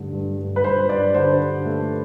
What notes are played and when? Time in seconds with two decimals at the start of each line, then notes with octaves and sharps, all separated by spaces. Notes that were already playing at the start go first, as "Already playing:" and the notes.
Already playing: G2 D3 A3
0.13 G2
0.39 G2
0.56 B4
0.64 G2 C5
0.89 G2 D5
1.15 D3 C5
1.40 D3
1.65 A3